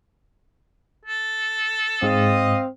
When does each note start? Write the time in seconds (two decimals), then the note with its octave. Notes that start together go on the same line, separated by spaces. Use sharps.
1.05 A4
2.02 G#2 G#3 C4 D#5 F5 D#6